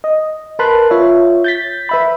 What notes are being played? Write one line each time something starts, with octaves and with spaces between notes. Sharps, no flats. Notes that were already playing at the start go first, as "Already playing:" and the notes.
D#5
A#4 B4 A5 B5 C6 F#6
F4 C#5 E5
G6 A6 B6
B4 E5 B5